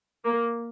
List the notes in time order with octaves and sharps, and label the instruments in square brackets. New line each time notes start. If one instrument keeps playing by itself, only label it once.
[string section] A#3